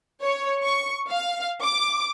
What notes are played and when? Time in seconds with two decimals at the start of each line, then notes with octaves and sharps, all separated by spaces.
0.22 C#5
0.63 C#6
1.09 F5
1.62 D6